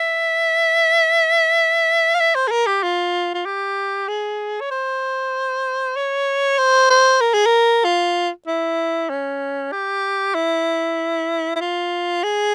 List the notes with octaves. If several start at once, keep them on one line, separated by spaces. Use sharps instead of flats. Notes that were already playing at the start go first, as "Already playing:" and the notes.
Already playing: E5
F5
E5
C5
G#4
A#4
G4
F4
F4
G4
G#4
C#5
C5
C#5
C5
C5
A#4
G#4
A#4
F4
E4
C#4
G4
E4
E4
F4
G#4